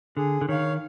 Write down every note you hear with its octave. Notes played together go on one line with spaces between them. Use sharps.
D3 G#4
D3
D#3 C#5 F5